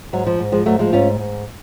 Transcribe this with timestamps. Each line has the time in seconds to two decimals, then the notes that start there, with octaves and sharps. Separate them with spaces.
0.13 G#2 F#3
0.27 F3
0.39 G#2
0.52 F3 G#3
0.66 G#2 F#3 A3
0.79 F3 G#3
0.93 G#2 C#4 F4
1.19 G#2